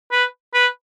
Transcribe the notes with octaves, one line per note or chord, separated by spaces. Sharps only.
B4
B4